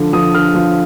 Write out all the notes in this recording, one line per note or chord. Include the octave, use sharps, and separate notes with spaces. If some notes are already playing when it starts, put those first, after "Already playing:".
Already playing: D3 F3
F3 D#6
D3 F6
F3